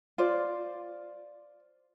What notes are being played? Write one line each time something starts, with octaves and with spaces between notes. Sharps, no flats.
F4 C5 D5